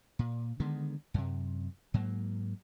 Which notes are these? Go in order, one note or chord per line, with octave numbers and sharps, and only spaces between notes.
A#2
D3 D#3 G#3 B3
F#2 C3
G#2 F#3 A#3